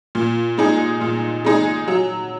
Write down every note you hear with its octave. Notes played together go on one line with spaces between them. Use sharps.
A#2
G#3 D#4 G#4
A#2
G#3 D#4 G#4
F#3